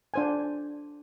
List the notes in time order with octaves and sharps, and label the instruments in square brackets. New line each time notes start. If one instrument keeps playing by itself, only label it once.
[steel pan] D4 C5 G#5